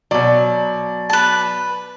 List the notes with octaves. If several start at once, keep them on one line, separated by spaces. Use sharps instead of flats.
B2 F#3 D5
B4 A5